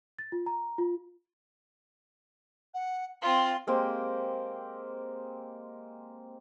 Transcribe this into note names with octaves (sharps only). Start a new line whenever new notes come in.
A6
F4
A#5
F4
F#5
C4 F4 F5 C6
G#3 A#3 C4 G4